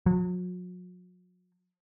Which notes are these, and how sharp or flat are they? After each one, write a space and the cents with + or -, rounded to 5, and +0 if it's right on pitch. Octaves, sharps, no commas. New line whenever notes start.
F#3 -40